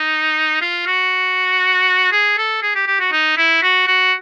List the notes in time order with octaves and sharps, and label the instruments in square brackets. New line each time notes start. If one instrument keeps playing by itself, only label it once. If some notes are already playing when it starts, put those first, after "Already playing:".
Already playing: [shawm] D#4
F4
F#4
G#4
A4
G#4
G4
G4
F#4
D#4
E4
F#4
F#4